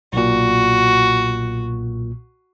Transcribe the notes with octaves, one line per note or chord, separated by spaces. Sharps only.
B1 A#2 F#4